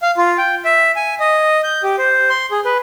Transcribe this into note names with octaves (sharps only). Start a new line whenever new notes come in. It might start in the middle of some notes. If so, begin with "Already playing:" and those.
F5
F4
G5
E5
G#5
D#5
G6
G4
C5
C6
G#4
B4